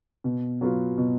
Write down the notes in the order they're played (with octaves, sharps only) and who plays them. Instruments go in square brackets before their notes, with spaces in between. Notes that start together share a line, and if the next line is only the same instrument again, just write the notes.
[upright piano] B2
F#3 B3 F4
B2